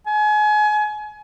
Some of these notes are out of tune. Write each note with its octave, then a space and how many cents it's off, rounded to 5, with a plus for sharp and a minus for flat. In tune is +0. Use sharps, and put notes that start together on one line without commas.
G#5 +30